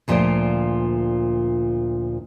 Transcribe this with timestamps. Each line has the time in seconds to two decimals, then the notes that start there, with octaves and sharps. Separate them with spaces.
0.08 D2 A#2 F3 F4 C5 D5